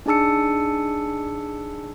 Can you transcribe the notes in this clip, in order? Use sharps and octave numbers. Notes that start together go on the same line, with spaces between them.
D4 D#4 G#4 A5 E6 C#7